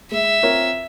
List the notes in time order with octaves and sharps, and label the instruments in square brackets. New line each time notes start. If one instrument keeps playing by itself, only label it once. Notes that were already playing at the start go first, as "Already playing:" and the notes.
[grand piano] G#3 [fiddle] E5
[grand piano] C4 F4 A#4 C#5